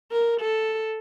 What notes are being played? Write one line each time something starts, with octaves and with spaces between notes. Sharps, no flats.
A#4
A4